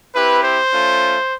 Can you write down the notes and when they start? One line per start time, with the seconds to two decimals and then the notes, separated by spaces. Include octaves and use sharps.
0.15 C4 E4 G4 B4
0.44 C5
0.72 A3 C#4 F4